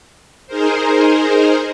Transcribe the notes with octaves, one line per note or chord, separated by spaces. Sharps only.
D#4 G#4 A#4 C5